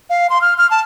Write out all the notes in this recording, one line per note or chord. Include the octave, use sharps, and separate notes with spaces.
F5
C6
F6
F6
A5